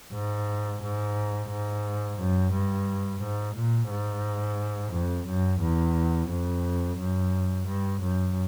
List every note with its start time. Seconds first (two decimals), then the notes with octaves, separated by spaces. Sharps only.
0.13 G#2
0.82 G#2
1.50 G#2
2.19 F#2
2.53 G2
3.22 G#2
3.55 A#2
3.90 G#2
4.93 F2
5.27 F#2
5.61 E2
6.30 F2
6.98 F#2
7.67 G2
8.01 F#2